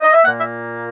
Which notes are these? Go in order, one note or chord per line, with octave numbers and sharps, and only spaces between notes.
D#5
E5
A#2 A#3 F#5
E5